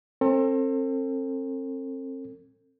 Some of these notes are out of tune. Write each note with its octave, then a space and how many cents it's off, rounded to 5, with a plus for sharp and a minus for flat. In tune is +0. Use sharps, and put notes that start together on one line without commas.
C4 +35 A4 +40